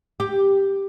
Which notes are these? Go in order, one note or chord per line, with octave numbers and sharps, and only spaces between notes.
G4